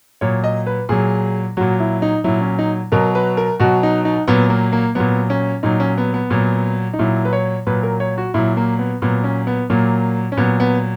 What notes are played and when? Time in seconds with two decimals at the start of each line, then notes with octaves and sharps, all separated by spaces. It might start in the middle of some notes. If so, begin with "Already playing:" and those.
0.21 A#2 F#3 C#5
0.44 D#5
0.66 B4
0.89 A#2 F#3 G#4
1.57 A#2 F#3 F#4
1.80 E4
2.02 D#4
2.24 A#2 F#3 E4
2.42 C#4
2.59 D#4
2.92 B2 F#3 A#4
3.15 B4
3.37 A#4
3.60 B2 F#3 F#4
3.83 D#4
4.05 D#4
4.28 A#2 F#3 B3
4.50 A#3
4.72 A#3
4.95 A#2 F#3 B3
5.30 C#4
5.63 A#2 F#3 D#4
5.80 C#4
5.98 B3
6.14 B3
6.31 A#2 F#3
6.93 D#4
6.99 A#2 F#3 E4
7.25 B4
7.33 C#5
7.67 A#2 F#3 B4
7.83 A#4
8.00 C#5
8.18 F#4
8.34 A#2 F#3 E4
8.57 A#3
8.79 B3
9.02 A#2 F#3 B3
9.24 C#4
9.47 B3
9.70 A#2 F#3 A#3
10.32 C#4
10.37 A#2 F#3 B3
10.60 B3